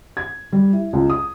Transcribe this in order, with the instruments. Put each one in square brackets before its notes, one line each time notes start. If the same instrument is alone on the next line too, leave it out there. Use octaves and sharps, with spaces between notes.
[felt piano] G#6
G3
E4
C#2
D#6